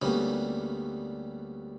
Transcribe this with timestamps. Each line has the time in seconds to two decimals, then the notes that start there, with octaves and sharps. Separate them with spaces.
0.02 D2 D3 G3 A#3 B3 C#4